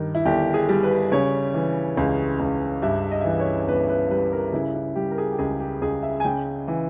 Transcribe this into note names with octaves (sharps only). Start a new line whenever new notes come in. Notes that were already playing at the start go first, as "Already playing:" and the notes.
Already playing: G2 D#3
E4
G1 G4
G#4
G3
B4
C#3 C#5
E3
C#2
C#2
G2 E5
D#5
E3 E5
D#5
C#5
G1 B4
B4
G3 B4
A#4
C#3 E4
E4
G3 G4
A#4
G#4
G4
C#2 G#4
G4
C#2 G#4
E5
G#5
C#3 G5
E3